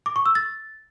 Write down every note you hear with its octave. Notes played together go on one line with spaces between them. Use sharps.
D6
C#6
E6
A6